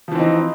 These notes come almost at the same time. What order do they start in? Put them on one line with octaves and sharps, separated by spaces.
F3 E3 C4 D#4